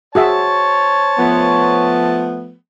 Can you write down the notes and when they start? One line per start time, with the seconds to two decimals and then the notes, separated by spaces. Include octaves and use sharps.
0.15 F#4 G#4 C5 C#5 E5 A5
1.19 F3 A3 B3